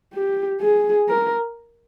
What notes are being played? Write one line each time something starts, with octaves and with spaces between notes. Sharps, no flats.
G4
G#4
A#4